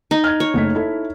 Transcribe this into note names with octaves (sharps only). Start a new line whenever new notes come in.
D#4
F6 G#6
C#5
F#1 A3 B6
E4 A4